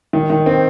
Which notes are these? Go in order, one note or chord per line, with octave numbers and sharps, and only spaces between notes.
D#3
D#3
C4